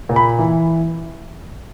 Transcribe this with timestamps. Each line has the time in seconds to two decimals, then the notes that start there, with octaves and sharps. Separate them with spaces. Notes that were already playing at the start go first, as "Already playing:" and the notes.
0.09 A#2
0.16 B5
0.39 E3